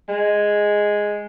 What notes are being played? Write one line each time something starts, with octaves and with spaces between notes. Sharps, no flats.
G#3